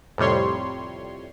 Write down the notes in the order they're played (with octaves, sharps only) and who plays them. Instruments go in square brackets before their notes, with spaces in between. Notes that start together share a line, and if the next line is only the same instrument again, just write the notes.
[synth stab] F2 A2 C3 G3 C#5 C6